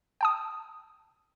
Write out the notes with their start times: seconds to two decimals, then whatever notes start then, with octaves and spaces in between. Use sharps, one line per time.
0.21 G5 A5 D#6